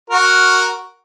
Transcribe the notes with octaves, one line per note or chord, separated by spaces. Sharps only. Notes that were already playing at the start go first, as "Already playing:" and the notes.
F#4 A#4